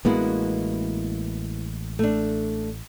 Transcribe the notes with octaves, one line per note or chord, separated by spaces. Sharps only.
A1 G#3 A#3 B3 E4 F#4
A3 D4